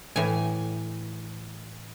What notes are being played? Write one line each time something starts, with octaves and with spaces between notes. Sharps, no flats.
A2 E3 G#5